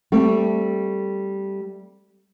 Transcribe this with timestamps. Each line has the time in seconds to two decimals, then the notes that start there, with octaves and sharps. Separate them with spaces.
0.12 G3 A3 C4